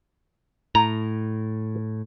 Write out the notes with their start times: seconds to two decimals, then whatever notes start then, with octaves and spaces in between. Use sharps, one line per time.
0.75 A2 A#5